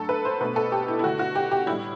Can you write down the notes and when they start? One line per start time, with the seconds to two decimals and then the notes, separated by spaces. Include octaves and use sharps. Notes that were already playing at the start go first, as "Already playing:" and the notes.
Already playing: G2 F#3 A3 A4
0.09 B4
0.25 C5
0.40 B2 A3 B4
0.56 A4
0.72 G4
0.88 E4
0.99 E4
1.04 G2 D3 A3 F#4
1.19 F#4
1.35 G4
1.51 G4
1.67 A2 G3 E4